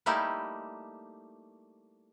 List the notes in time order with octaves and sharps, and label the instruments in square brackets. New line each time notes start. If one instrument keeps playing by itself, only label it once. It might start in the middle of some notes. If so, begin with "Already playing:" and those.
[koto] G3 A3 A#3 D#4 E4 G4